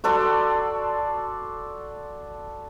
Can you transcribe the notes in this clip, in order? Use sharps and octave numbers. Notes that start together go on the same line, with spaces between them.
F#4 A4 D5 C6